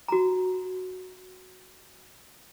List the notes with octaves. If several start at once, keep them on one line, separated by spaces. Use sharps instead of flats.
F#4 A#5